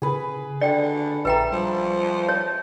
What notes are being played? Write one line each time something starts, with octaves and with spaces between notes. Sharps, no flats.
C#3 G#4 B4
D3 D5 G5 C#7
A#1 B4 D5 E5 G5 A#5
F3 G3
C#5 A5